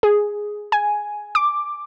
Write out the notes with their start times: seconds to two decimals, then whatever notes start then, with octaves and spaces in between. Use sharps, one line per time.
0.03 G#4
0.72 G#5
1.35 D6